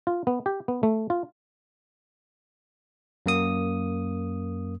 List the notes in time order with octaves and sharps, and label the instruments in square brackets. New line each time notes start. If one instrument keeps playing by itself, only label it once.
[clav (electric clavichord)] F4
B3
G4
B3
A3
F4
[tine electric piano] F#2 A#3 D#6